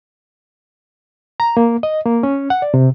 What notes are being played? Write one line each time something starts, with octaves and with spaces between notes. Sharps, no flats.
A#5
A#3
D#5
A#3
C#4
F#5
D5
C3